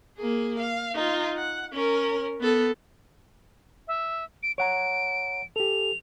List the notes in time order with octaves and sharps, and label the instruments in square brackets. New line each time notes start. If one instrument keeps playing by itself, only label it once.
[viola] A#3 G#4
F5
D#4 F4
F#5
C#4 A#4
B3 A4
[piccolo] E5
D7
[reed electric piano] C#5 F#5 A#5 [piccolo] D7
[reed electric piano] G4 A4 [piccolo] F7